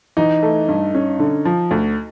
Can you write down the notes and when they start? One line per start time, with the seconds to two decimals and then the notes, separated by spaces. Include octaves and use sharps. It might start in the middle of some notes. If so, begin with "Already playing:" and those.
0.17 E3 D#4
0.43 A3
0.68 G2
0.95 C#4
1.19 D3
1.45 F3
1.71 D2